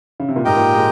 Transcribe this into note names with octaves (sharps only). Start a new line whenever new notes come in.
C#3
C3
A#2
G#2 G4 A#4 D#5 G5
A#2
G#3